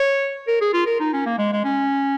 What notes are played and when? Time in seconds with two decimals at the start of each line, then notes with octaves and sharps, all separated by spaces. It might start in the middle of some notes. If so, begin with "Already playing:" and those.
Already playing: C#5
0.48 A#4
0.61 G#4
0.73 F4
0.87 A#4
1.00 D#4
1.13 C#4
1.26 A#3
1.39 G#3
1.53 G#3
1.64 C#4